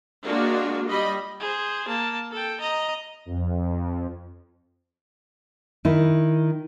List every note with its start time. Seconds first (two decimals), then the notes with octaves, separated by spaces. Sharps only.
0.24 G#3 A#3 D4 F4 F#4
0.87 G3 D#5 B5
1.40 G#4 C5
1.88 A#3 A5
2.32 A4 G5
2.61 D#5 A#5
3.26 F2
5.85 D#3 E4